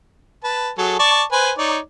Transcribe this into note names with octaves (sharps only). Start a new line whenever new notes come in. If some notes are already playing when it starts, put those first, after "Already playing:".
B4 A5
F#3 G#4 A4
D5 A5 C#6
B4 C5 G#5
D#4 C#5 D5